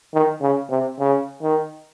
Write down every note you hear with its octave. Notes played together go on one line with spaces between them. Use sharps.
D#3
C#3
C3
C#3
D#3